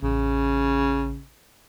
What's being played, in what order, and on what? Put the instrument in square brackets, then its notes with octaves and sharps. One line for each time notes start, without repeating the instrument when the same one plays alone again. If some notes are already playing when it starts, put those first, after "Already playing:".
[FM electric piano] A1 [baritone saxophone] C#3